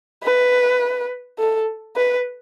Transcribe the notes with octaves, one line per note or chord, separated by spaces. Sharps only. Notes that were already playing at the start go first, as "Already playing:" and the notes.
B4
A4
B4